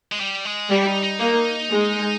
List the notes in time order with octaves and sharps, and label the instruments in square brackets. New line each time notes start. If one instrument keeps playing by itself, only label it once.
[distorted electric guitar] G#3
G3
G#3
[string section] G3 [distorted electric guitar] A#3
[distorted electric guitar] E4
D#4
D#4
[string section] A#3 [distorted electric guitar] D#4
[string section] G#3